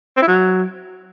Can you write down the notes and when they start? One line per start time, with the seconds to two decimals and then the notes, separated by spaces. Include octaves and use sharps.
0.17 C4
0.22 E4
0.27 F#3